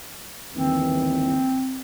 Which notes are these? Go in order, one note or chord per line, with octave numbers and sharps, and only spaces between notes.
G1 D#2 E3 C4